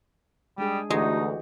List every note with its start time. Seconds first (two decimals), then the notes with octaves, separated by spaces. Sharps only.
0.58 G3 G#3 D4 G#4
0.90 D2 E3 G#3 D#4 F#4 G4